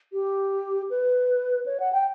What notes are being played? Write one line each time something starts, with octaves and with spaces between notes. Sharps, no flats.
G4
B4
C#5
F#5
G5